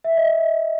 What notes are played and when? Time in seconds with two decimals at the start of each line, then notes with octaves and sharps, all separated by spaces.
0.04 E5
0.17 D#5